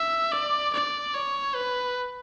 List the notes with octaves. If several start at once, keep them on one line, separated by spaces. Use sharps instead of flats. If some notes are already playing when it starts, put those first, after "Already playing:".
Already playing: E5
D5
D5
C#5
B4